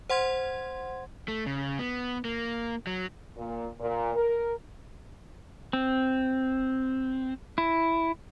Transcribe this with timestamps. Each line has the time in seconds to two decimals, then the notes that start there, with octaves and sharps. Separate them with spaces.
0.10 C5 F#5 C6 G#6
1.28 A3
1.46 C#3
1.79 B3
2.25 A#3
2.87 F#3
3.37 A#2
3.80 A#2
4.15 A#4
5.73 C4
7.58 E4